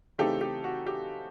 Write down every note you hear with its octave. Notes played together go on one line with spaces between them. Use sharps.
C#3 E3 A3 C4 D#4 G4 A4
G4
F#4
G4